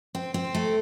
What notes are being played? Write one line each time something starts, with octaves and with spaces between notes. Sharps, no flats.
C4
C4
A3